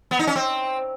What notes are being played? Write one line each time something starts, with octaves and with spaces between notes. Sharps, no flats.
B3
D#4
C#4
C4